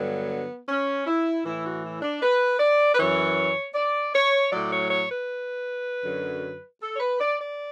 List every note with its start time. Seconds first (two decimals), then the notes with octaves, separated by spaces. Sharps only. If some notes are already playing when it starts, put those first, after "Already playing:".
Already playing: G2 D3 F#3 B3
0.69 C#4
1.07 E4
1.45 A2 E3 E4
1.65 F#4
1.84 E4
2.02 D4
2.22 B4
2.59 D5
2.94 B4
2.99 F#2 E3 C#5
3.75 D5
4.14 C#5
4.52 A2 F#3 D5
4.71 C#5
4.90 C#5
5.08 B4
6.04 F#2 D3 F#3
6.82 A4
6.93 C#5
7.00 B4
7.20 D5
7.40 D5